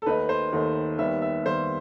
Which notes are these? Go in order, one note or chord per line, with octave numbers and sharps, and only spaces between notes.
A4
D#2 D#3 A3 D#4 B4
C5
D#2 D#3 A3 D#4
D#2 D#3 G3 B3 E5
E5
D#2 D#3 G3 B3 C5